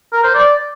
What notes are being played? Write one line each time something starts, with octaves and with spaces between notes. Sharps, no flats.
A#4
C5
D5